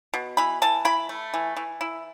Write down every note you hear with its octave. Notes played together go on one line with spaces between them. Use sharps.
B2
E3 B5
E3 A5
E4 B5
A3
E3
E3
E4